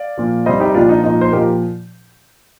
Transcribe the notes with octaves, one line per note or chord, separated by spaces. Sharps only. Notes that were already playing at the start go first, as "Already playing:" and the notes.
Already playing: D5 F5
A#2 F3
C3 G3 C5 D#5
D#4 G4
A#2 F3 D4 F4
D#4
A#2 F3 D#4
C5
A#2 F3 G4 A#4